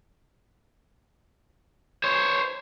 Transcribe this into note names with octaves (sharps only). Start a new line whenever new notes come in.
C5 C#5